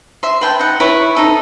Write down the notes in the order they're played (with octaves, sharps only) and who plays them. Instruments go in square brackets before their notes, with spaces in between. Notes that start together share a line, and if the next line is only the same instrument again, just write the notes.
[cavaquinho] E5 C6
B4 G5 A5
D#4 F#5
E4 B4 C#5
D#4 A4 E5